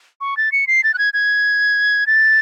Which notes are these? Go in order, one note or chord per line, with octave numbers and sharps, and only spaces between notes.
C#6
A6
C#7
C7
A6
F#6
G#6
G#6
A6